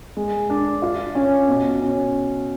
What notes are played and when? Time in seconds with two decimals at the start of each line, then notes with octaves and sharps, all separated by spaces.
0.17 G#3
0.50 D4
0.82 F4
1.15 C#4
1.48 B2
1.81 C#4